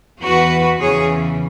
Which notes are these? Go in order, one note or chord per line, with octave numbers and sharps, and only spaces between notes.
E2 E3 F#4 B4
E2 C#3 E3 G#4 C#5